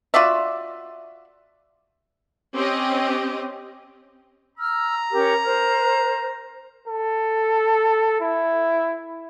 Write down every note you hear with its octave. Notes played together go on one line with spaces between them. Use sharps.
F4 F#4 D5 E5
C4 C#4 G4 D#5
A#5 E6 F6
C#4 G4 A#4
A#4 C5
A4
E4